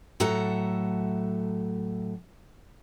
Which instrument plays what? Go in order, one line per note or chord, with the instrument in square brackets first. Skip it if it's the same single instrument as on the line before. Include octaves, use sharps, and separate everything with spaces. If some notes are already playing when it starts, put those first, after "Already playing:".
[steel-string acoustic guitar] A2 F#3 A4 E5 F#5 A#5